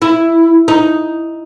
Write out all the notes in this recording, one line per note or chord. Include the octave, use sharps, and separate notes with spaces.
E4
D#4